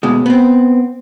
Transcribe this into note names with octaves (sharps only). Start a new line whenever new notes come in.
D#2 B2 G#3
B3 C4